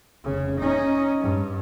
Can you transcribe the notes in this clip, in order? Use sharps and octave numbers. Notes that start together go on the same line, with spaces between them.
F1 C#3
C#4 D#4
G2